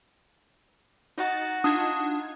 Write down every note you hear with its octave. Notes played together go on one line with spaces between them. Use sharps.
D#4 F#4 A6
D4 D#4 F4 D#6 G#6